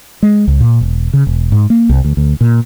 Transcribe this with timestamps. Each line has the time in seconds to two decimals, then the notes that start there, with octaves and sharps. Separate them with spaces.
0.23 G#3
0.48 C#2
0.61 A#2
0.81 E1
1.13 C#3
1.27 E1
1.52 G#2
1.70 A#3
1.89 C2
2.05 D2
2.17 D2
2.41 A#2